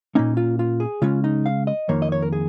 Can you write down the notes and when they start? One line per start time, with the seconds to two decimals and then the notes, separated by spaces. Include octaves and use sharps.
0.15 A#2 A#3 C#4 D#4
0.37 F4
0.59 F4
0.80 G#4
1.02 C#3 G#3 C#4 F4
1.24 D#4
1.46 F5
1.67 D#5
1.89 F2 D#3 A#3 C#5
2.02 D#5
2.12 C#5
2.22 A#4
2.33 G#4